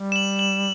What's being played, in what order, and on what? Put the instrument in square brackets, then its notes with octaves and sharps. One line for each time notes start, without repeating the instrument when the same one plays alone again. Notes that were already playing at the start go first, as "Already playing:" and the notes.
Already playing: [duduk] G3
[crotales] E7
F#7
F#7